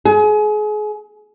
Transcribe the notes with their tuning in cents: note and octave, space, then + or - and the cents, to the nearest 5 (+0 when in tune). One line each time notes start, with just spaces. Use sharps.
G#4 +30